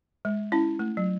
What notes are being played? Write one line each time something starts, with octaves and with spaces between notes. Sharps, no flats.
G#3
C#4 E4
A3
F#3